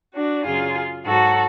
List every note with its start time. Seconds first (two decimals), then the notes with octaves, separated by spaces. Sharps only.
0.14 D4 F#4
0.45 F#2 C#3 F#3 F4 G#4
1.05 G#2 F#3 F#4 A4